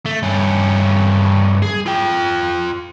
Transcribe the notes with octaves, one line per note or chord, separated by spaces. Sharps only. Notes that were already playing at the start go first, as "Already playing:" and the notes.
A3
G2 C#4
G#4
F4 G5